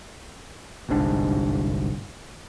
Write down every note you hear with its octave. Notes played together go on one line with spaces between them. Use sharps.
G1 C2 G#2 D4